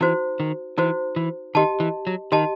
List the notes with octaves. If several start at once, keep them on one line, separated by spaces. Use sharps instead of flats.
E3 D#4 F#4 C5
D#3
E3 D#4 F#4 C5
E3
D#3 G4 D#5 A5
E3
F#3
D#3 G4 D#5 A5